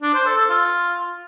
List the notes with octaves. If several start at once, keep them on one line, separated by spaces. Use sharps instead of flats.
D4
C5
A4
A4
F4